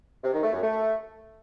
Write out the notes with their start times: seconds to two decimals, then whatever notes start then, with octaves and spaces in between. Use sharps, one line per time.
0.24 C3
0.33 D#3
0.43 A3
0.53 F#2
0.62 A3